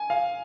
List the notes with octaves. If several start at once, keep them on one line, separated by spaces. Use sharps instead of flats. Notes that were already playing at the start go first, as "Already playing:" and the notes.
Already playing: G#5
F5